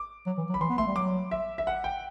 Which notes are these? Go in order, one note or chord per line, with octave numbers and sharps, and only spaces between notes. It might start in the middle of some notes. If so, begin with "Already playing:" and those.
Already playing: D6
F#3
E3
F#3
B5
E3 C6
B3
A3 C6
G3
F#3 D6
E5
E5
F#5
G5